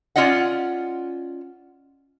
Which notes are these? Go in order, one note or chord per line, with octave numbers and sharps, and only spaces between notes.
C#4 F4 D5 D#5 F#5